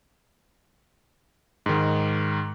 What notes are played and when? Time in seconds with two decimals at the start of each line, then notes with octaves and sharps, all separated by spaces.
1.66 G#2 D#3